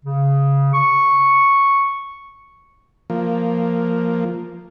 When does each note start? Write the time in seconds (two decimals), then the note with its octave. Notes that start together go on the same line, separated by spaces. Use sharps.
0.05 C#3
0.74 C#6
3.10 F3 A#3